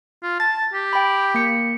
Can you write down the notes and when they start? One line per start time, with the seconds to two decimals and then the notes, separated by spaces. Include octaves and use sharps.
0.23 F4
0.40 A5 A6
0.74 G4
0.93 G5 B5
1.34 A#3 C#7